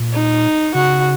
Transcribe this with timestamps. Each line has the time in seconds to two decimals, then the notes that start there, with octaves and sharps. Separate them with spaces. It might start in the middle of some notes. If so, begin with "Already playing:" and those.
Already playing: A#2
0.13 D#4
0.75 C#3 F#4